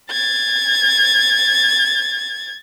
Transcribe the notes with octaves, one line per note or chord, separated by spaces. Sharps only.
G#6 A6